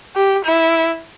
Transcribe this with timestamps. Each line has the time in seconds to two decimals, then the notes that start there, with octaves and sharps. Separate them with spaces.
0.16 G4
0.46 E4